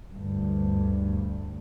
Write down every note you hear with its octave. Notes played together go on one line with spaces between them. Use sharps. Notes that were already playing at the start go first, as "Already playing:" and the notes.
D2 G2